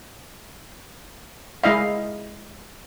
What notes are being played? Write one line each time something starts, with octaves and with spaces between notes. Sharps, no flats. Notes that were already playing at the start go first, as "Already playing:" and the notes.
G#3 E4 D#5 F5